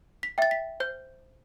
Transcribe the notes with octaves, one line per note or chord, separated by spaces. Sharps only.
B6
E5 G5 A6
B6
C5 G6